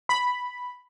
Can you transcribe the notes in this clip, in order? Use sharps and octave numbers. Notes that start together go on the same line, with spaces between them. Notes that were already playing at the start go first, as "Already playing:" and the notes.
B5